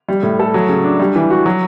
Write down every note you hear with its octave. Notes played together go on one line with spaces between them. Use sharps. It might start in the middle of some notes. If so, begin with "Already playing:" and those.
G3
A2
A4
F#3
C#3
D4
G3
E3
F#4
F#3